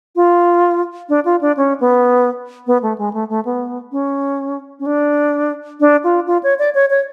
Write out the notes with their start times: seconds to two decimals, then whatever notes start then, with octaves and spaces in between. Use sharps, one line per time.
0.16 F4
1.09 D4
1.25 F4
1.41 D4
1.57 C#4
1.80 B3
2.67 B3
2.82 A3
2.98 G#3
3.13 A3
3.29 A3
3.45 B3
3.92 C#4
4.79 C#4
4.86 D4
5.80 D4
6.04 F4
6.27 F4
6.43 C#5
6.59 D5
6.75 C#5
6.90 C#5